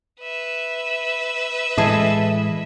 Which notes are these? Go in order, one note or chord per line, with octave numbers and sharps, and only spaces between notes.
B4 E5
A2 E3 G#3 E4 G#4 A4 D#5